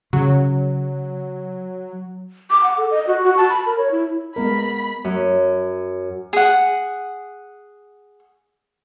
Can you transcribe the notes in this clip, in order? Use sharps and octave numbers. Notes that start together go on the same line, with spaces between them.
C#3 F#3
D6
F#5
A4
D#5
F#4
F#4
A5
B5
A#4
C#5
E4
G#3 B3 A#4 B5
F#2
G#4 F#5